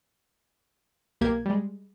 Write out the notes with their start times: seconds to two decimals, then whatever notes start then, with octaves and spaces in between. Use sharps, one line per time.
1.21 B1 A#3 G4 G#6
1.46 G3 G#3